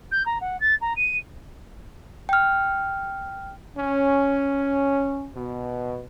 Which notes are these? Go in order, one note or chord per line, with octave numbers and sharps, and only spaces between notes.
G6
A#5
F#5
A6
A#5
D#7
G5 F6
C#4
B2